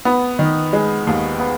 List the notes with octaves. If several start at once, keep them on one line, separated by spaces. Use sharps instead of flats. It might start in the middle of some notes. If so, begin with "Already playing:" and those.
B3
D#3
G#3
D#2
B3